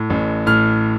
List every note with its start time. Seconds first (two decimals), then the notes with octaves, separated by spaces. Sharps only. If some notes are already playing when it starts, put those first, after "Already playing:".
Already playing: A2
0.10 A1
0.46 A2 F6